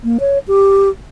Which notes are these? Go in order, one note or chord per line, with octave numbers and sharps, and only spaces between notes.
A#3
C#5
G4